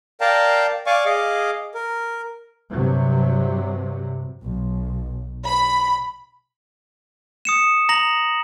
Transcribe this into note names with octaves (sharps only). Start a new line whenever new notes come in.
A#4 D5 F5 G5 A5 A#5
D5 F5 G#5 C#6 D6
G#4 D#5 F5 D6
A#4
G2 C3 F#3
B1
B5
D#6 C#7 E7
A#5 A#6 F#7